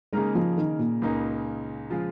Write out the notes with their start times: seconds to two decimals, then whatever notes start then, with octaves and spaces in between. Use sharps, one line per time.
0.13 C#3 G#3 A#3 D#4 A#4
0.35 F3
0.57 D#3
0.79 A#2
1.02 C#2 C#3 A#3 D#4
1.90 C#3 F3 G#3 F4